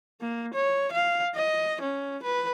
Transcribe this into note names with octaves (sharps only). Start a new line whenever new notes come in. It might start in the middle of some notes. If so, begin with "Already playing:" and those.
A#3
C#5
F5
D#5
C#4
B4